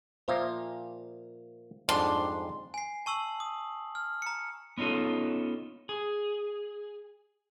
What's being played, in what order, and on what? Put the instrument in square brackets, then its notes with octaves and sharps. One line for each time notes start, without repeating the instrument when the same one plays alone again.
[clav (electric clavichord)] A#2 F3 A#3 [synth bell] C5 E5 F5
[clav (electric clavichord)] F2 G#2 G3 [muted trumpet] D4 [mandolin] C6
[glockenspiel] G#5 C7
A5 C#6 E6 F#7
D#6
F6
A#5 C#7
[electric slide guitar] B3 C#4 D#4 F4 A4
G#4